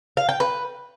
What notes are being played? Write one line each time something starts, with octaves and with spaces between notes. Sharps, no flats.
F5
G5
B4